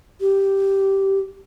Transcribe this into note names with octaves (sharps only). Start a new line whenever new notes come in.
G4